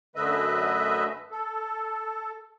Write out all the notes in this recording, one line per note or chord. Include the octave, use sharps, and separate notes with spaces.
F#2 D3 A3 B4 D#5 E5
A4